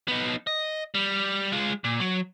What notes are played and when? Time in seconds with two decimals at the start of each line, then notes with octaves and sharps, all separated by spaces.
0.08 B3 D#4
0.47 D#5
0.94 G3
1.52 G#3 F4
1.84 A#2
2.00 F#3